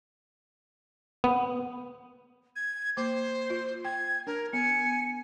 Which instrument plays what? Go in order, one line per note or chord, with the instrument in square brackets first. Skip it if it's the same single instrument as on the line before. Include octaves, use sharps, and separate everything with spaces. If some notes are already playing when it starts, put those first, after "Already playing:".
[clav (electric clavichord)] B3
[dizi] G#6
[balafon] A#3 D6 [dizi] C5
[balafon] F4
[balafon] G5 [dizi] G#6
[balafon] D4 [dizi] A#4
[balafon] B3 [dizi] G#5 [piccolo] C#7